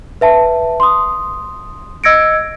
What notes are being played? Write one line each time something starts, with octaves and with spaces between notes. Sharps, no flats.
B4 E5 A5
C6 D#6
D#5 E6 G#6 A#6 C#7 D7